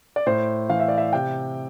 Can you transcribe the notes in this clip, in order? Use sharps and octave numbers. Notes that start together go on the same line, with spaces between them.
D5
A2 C5
E3 F5
E5
D5
E5
C3 G5